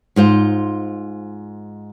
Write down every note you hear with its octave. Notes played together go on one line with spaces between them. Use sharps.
G#2 F4 C5